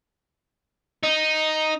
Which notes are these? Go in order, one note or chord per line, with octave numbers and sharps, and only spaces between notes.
D#4